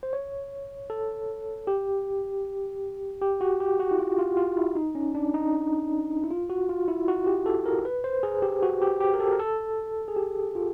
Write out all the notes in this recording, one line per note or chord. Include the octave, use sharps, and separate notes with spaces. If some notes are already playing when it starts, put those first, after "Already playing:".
C5
C#5
A4
G4
G4
F#4
G4
F#4
E4
F4
F4
F4
E4
D#4
C#4
D4
D#4
E4
F4
F#4
F4
E4
F#4
G4
A4
A#4
B4
C5
G#4
G4
F#4
G4
G4
A#4
A4
A#4
A4
G#4
G4
F4